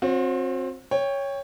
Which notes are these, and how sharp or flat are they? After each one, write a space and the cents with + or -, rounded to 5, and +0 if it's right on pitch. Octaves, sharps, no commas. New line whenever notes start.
C4 +20 F#4 -40 C#5 +0
C#5 +0 G5 +20